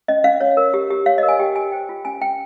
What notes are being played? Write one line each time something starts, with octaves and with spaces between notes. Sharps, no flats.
C#4 D#5
C#4 F5
C#5
A#4
G4
G4
C#5 F5
D#5
A#4
G#5
G4 G5
G4 G#5
C5 G5
F4
C#4 G#5
C#4 G5